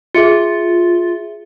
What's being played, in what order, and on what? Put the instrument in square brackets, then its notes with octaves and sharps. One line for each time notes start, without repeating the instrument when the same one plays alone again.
[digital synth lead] F4 [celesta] G#4 E5 C#7